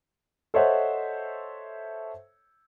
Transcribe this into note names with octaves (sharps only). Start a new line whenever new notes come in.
A4 C5 C#5 D#5 E5 F#5